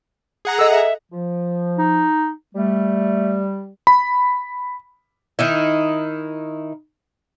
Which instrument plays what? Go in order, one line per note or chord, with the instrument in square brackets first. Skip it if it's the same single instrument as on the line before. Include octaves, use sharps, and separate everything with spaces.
[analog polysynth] G#4 F#5 A#5
[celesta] A4 D#5 [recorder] E6
[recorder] E5
[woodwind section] F3
[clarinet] D#4
[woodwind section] G3 [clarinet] A3
[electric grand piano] B5
[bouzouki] D#3 D#4 E4